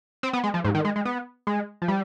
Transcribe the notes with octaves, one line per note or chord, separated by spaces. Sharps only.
C4
B3
G#3
F3
G#2
D#3
G#3
G#3
B3
G#3
F3
G3